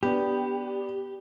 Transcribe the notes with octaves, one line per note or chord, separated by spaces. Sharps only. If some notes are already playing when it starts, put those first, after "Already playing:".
B3 D4 G4